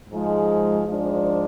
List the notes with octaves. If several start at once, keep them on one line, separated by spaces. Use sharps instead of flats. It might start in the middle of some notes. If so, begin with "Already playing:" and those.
G#2 F3 G#3
G#2 F3 G#3 D4